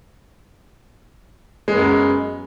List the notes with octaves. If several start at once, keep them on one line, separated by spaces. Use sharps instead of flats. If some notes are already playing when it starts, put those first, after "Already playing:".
F#2 G#3 B3